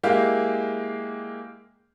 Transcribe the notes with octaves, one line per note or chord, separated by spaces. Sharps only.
G#3 A#3 E4 G4 F5